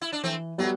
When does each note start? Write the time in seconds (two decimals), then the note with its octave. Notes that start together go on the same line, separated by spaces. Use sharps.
0.01 E4
0.12 D4
0.24 E3 A3 C4
0.58 F#3 G3 A3 B3 F#4